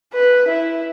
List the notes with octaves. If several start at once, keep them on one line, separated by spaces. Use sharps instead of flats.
B4
E4